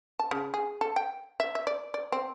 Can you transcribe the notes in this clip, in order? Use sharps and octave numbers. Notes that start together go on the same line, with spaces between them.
A5
C#3
G#4
A4
G5
E5
E5
D5
D5
C4